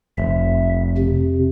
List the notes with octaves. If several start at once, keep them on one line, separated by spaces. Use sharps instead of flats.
F1 E5
F2 C3